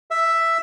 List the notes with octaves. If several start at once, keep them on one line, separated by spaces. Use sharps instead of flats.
E5